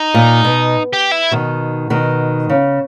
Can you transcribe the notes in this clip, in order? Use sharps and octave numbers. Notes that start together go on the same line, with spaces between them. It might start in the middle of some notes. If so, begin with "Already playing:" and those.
Already playing: D#4
A#2
B2
G4
E4
B2 D#3
B2 D#3
C#3